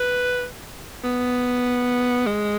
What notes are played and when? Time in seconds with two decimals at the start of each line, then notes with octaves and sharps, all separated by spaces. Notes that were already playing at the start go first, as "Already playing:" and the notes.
Already playing: B4
1.04 B3
2.26 G#3